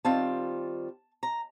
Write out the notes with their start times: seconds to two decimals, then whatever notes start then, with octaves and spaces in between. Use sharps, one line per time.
0.05 D#3 G3 C4 F4 A5
1.23 A#5